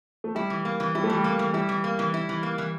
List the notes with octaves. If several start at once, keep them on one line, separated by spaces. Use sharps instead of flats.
A3
G3 E4
E3
A#3
E3
G3 E4
A3
E3 G3
A#3
E3
G3 E4
E3
A#3
E3
E4
E3
A#3
E3